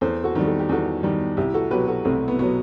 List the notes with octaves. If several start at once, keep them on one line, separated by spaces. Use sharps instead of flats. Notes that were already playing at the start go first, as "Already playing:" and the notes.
E2 A4 C5
F#4 A4
D#3 G3
A4
G4
E2 F#4 A4
D#3 G3
C2 E4 G4
F#4 A4
B2 F#3 G4 B4
F#4 A4
C2 A3 C4
B3
B2 F#3 B3